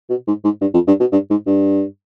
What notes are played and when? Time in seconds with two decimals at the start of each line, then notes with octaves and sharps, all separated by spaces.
0.10 B2
0.27 G#2
0.44 G#2
0.61 G2
0.74 F2
0.87 G2
1.00 B2
1.12 G2
1.30 G#2
1.47 G2